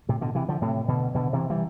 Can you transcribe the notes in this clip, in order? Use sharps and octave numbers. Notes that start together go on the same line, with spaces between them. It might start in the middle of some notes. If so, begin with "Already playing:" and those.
A2 C3
B2 D3
C3 E3
D3 F3
A2 C3
B2 D3
B2 D3
C3 E3
E3 G3